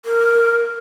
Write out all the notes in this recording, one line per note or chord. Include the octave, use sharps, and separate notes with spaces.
A#4